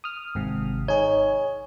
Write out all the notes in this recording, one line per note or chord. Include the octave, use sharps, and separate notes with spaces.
D#6 F6
G#1 G#2 C3
D#4 G#4 C#5